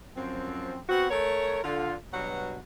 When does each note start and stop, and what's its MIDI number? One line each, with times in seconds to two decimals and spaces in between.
0.16 0.79 42
0.16 0.79 53
0.16 0.79 60
0.89 1.09 59
0.89 1.09 60
0.89 1.09 66
1.10 1.59 57
1.10 1.59 70
1.10 1.59 73
1.63 1.94 50
1.63 1.94 65
2.12 2.57 43
2.12 2.57 47
2.12 2.57 54
2.12 2.57 66
2.12 2.57 78